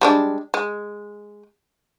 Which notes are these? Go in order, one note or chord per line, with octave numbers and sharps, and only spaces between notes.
G3 G#3 D4
G#3